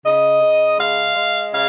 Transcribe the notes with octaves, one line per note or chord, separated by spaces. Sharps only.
C#3 D#5
C#3
G#3 F5
G#3
C#3 F5